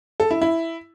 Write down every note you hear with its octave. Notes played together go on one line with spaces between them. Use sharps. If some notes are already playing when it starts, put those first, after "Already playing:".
A4
E4
E4